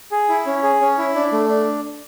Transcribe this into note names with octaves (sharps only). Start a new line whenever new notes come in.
G#4
E4
C#4
G#4
C#4
E4
D4
A3
D4